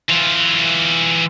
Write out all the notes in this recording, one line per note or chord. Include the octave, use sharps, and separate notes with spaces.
E3 F4